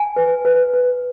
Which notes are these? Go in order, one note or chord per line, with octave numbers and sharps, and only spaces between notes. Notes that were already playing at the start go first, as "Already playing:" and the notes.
Already playing: G#5
B4
B4
B4